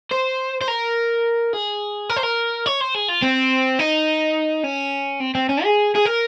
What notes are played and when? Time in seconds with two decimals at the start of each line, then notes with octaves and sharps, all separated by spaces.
0.11 C5
0.61 C5
0.68 A#4
1.53 G#4
2.10 A#4
2.16 C5
2.23 A#4
2.66 C#5
2.80 C5
2.95 G#4
3.08 F4
3.22 C4
3.79 D#4
4.64 C#4
5.20 C4
5.35 C4
5.49 C#4
5.64 G#4
5.95 G#4
6.05 A#4